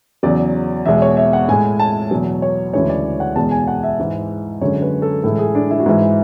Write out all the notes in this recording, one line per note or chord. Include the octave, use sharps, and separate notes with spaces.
E2 C#3 F#3 D5
E2 B2 G#3 E5
C#5
E5
F#5
A2 G#3 G#5
A5
E2 B2 F#3
C#5
D2 C#3 E3 G#3 C#5
D5
F#5
E2 B2 G#3 A5
G#5
F#5
E5
G#2 E3 G#3
F#2 D3 G#3 C#5
B4
A4
A2 E3 G#3 A4
G#4
D4
E4
F#4
G#2 E3 G#3 E4